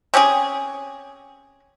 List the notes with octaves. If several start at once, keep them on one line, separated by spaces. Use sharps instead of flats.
C4 C#4 G4 G#4